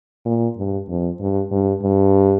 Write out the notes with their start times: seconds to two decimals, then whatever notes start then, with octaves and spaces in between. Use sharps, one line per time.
0.25 A#2
0.57 G2
0.89 F2
1.20 G2
1.51 G2
1.83 G2